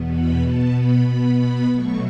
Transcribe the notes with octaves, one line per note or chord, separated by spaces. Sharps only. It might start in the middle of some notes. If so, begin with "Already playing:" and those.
Already playing: E2 B2 B3
B5
B2 B3 A5
B5
B2 B3 B5
B5
B2 F#3 A3 C#6